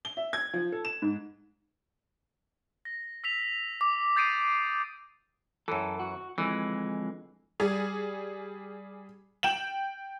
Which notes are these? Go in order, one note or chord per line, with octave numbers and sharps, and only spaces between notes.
G7
E5
G#6
F3
A4
E7
G#2
A#6
E6 B6 F7
D6
D#6 G6 A6 C7 D7 D#7
F#2 E3 A4
F#4
F2 D3 E3 G#3
G3 G#4
G5 E7 F#7